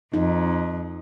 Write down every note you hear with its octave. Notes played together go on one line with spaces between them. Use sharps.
F2 D#4